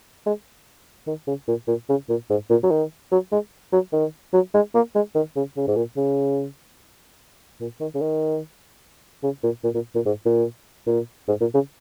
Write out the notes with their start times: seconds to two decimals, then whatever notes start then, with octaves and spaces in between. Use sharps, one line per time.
0.26 G#3
1.07 D#3
1.27 C#3
1.48 A#2
1.68 A#2
1.89 C#3
2.09 A#2
2.30 G#2
2.50 A#2
2.63 F#3
2.71 D#3
3.12 F#3
3.32 G#3
3.73 F#3
3.93 D#3
4.33 F#3
4.54 G#3
4.75 A#3
4.95 G#3
5.15 D#3
5.36 C#3
5.57 C#3
5.68 G#2
5.76 A#2
5.97 C#3
7.61 A#2
7.80 D#3
7.95 C#3
8.01 D#3
9.23 C#3
9.43 A#2
9.64 A#2
9.74 A#2
9.95 A#2
10.06 G#2
10.25 A#2
10.87 A#2
11.28 G#2
11.41 A#2
11.54 C#3